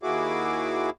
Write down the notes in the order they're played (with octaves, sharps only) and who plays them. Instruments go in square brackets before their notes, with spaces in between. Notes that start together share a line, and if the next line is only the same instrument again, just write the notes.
[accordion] D#2 A#3 E4 F#4 G#4 D6